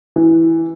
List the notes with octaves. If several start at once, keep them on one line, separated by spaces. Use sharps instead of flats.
E3